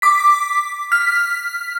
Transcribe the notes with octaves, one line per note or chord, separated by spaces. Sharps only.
D6 B6
F6 B6